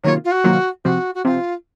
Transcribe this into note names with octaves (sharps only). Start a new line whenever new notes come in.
C3 D#3 F#3 A#3 F4 C#5
F4
F#4
C3 D#3 F#3 A#3 F4
C3 F3 C4 F#4
F#4
C3 F3 C4 F4